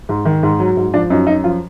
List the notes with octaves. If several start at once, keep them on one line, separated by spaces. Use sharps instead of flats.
G#2
D#3
G#2
F#3
G#2
F3 D4
F#2 D#4
F#2 D#4
F3 F4